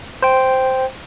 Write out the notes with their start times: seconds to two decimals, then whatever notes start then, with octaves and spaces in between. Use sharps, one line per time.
0.22 C5 G5